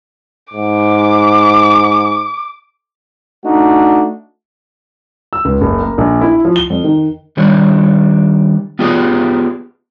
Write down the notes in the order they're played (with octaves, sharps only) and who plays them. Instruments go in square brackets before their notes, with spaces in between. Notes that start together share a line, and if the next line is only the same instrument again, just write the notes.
[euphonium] G#2 [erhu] D6
[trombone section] A3 D4 D#4 F#4
[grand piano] E6
C#2
F#1
A#3
A#1
E4
F3
G7
F2
D#3
[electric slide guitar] D#3 G3 D4 C#5
B3 F4 G4 G#4 B4